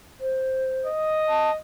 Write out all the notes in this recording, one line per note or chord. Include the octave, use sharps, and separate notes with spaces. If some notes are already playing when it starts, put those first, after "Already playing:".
C5
D#5
A5